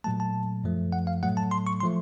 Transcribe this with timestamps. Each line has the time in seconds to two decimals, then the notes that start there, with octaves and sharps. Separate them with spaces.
0.04 A#2 F#3 A3 A5
0.20 A5
0.64 F#2 F3 A3
0.92 F#5
1.07 F5
1.23 A2 F#3 A3 F#5
1.37 A5
1.51 C6
1.67 C#6
1.80 C6
1.83 F3 A3